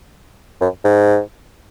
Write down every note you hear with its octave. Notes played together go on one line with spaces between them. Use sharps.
F#2
G#2